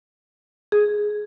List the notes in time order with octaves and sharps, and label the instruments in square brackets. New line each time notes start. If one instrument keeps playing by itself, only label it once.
[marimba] G#4